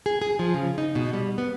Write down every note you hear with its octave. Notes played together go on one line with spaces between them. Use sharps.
G#4
G#4
F3
C#3
D#4
B2
G3
B3